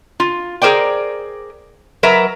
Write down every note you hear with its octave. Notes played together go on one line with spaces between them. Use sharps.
F4
G#4 A#4 C5 D5 G5
F#3 A#4 B4 E5